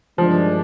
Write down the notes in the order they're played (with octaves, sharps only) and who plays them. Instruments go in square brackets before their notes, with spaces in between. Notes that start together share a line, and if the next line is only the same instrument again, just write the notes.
[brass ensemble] G2 D#3 G#3 D4 [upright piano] F3